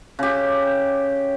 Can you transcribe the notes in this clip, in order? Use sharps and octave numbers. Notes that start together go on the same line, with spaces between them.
C#3 G4